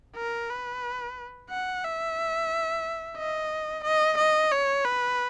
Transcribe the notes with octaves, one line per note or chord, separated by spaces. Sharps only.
A#4
B4
F#5
E5
D#5
D#5
D#5
C#5
B4